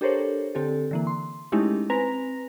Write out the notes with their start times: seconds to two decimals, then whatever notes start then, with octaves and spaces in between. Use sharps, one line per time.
0.01 D4 G4 A4 A#4 C5 C#5
0.55 D3 C4 G4 A4
0.91 D3 E3 A#3
1.07 C6
1.52 G#3 A3 C#4 D#4 E4 G4
1.90 C4 B4 G#5 A#5 A#6 F7